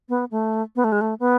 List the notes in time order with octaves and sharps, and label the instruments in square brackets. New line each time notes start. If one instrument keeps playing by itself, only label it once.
[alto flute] B3
A3
B3
A3
G#3
A3
B3